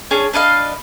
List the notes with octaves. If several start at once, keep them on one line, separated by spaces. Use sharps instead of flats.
C#4 D4 G#4 C#5
D4 B4 D#5 F5